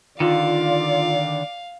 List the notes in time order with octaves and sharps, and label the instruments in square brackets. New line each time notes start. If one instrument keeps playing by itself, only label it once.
[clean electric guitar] D3 D#3 [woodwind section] F4 [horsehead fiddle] D5 [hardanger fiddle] F5